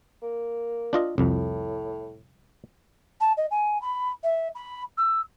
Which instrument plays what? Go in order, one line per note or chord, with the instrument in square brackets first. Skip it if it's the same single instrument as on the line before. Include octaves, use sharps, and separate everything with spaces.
[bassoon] A#3
[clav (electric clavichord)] D4 F4 D#5
[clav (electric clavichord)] C2 F2 [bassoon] A2
[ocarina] A5
D#5
G#5
B5
E5
B5
E6